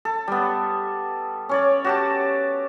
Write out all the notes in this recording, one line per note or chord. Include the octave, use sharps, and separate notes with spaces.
A4
G3 B3
C#4 C#5 D5
F#4 G4 A5